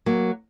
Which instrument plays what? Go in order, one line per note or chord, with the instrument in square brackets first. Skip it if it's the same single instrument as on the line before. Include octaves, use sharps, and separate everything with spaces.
[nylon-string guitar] F#3 A#3